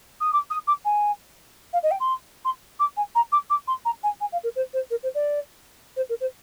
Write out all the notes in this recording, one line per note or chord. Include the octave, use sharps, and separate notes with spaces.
D#6
D6
D#6
D6
G#5
F5
D#5
G5
C6
C6
D6
G#5
A#5
D6
D6
C6
A#5
G#5
G#5
F5
A#4
C5
C5
A#4
C5
D5
C5
A#4
C5